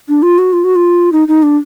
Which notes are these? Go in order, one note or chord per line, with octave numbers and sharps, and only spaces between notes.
D4
F4
F#4
F4
F#4
F4
D#4
D#4
D4